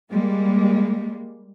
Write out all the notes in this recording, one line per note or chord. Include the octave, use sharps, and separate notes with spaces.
G3 G#3 A#3